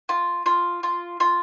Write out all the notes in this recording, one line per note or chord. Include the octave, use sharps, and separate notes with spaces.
F4
F4
F4
F4